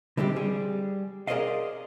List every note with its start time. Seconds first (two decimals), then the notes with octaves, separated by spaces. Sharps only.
0.17 D3 G3 G#3 C4 F#4 G4
0.36 G3 G#4
1.28 G#4 A#4 C5 D5 D#5 F5